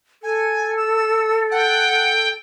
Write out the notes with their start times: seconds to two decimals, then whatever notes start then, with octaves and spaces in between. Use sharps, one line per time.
0.23 A4 G#5
0.77 E6
1.51 F#5 G5